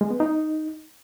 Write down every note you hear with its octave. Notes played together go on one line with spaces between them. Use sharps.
G#3
B3
D#4